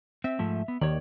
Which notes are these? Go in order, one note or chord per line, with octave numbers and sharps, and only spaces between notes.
C4 E5
G#2 F3 A3
B3
D#2 D#3 C#5 D5